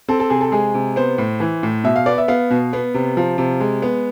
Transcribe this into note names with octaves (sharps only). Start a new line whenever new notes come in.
C4 A4
A4
C3 G#4
A4
G#3 G#4
C3
B3 C5
A2
E3
A2
B2 E5
F5
B3 D5
E5
B3 F5
B2
B3
C3
F3
C3
G#3
B3